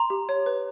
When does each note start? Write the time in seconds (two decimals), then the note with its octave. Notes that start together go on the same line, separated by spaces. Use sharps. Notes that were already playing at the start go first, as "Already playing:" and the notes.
Already playing: A#5 C6
0.10 G4
0.29 C#5
0.46 B4